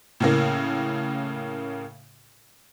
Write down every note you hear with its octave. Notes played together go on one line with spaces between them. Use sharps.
A2 C#3 A#3